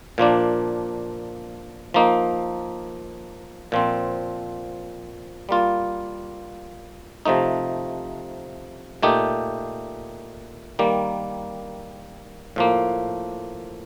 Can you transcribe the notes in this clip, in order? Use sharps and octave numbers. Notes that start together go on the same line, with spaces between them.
A#2 F3 A#3 D4
F3 A#3 D#4
A#2 F3 C4
G3 A#3 F4
C3 F3 A3 D#4
A#2 A3 D#4 G4
D#3 G3 A#3
A2 F3 A#3